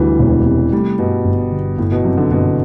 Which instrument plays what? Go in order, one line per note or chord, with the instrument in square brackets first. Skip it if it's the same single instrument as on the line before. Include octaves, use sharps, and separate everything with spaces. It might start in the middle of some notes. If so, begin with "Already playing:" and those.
Already playing: [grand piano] D2 [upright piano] E3 G3
[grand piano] E1
C3
[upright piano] G3 [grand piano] A3
[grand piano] G2 [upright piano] B2
[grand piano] G1
D3
[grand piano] G1 [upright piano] A2
[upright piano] B2
[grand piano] F#2 [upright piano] C3
[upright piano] D3
[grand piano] G1 [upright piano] B2